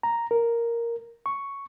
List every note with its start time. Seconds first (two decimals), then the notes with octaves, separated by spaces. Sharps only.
0.03 A#5
0.31 A#4
1.26 C#6